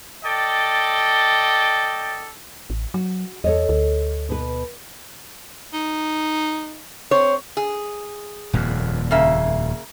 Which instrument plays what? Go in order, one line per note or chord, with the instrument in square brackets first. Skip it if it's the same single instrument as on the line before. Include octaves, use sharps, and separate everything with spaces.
[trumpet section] A4 D5 D#5 G5
[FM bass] A1
[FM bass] F#3 [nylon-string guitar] F#4
[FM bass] E2 [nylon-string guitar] A4 C#5 D#5
[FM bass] D2
[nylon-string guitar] B2 B4
[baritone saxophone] D#4
[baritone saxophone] C4 [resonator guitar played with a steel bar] C#5
[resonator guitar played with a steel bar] G#4
[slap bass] D#1 F2 A#2
[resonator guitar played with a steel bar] C#3 A#3 E5